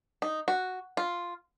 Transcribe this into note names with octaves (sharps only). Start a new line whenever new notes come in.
D#4
F#4
F4